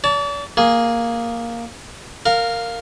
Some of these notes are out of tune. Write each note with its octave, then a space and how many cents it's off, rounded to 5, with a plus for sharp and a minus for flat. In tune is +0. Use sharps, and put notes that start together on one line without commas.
D5 -45 A5 +0
A#3 +0 G#4 +0
A#4 -15 F5 +5